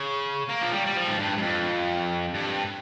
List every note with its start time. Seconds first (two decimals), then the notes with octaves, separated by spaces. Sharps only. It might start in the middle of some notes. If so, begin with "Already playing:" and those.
Already playing: C#3
0.49 A#3
0.62 F3
0.72 G3
0.86 G3
0.96 F3
1.07 G#2
1.18 G2
1.38 G2
1.42 F2
2.35 G2